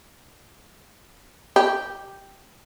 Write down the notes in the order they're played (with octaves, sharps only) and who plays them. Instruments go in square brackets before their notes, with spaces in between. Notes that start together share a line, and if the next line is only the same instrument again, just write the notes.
[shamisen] G4